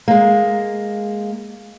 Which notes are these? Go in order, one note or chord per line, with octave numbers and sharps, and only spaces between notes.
G#3 A#3